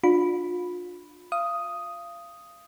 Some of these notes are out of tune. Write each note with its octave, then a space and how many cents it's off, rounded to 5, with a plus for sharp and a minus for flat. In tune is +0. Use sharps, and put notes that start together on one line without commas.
D4 +20 F4 +35 B5 +0
F5 -30 D#6 +0